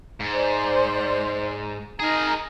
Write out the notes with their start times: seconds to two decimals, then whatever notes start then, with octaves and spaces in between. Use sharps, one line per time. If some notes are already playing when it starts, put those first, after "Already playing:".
0.20 G#2
0.33 C5 D5
2.00 D#4 G#4 A#4 A#5